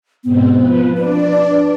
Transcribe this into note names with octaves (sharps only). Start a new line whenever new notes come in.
G#2 B2 B3 C4
F3 B4
D4 B4 D5
B4